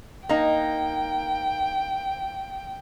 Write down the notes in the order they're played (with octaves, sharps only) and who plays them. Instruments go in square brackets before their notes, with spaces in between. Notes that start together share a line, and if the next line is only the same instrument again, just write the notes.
[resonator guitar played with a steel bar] A#3 D#4 [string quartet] G5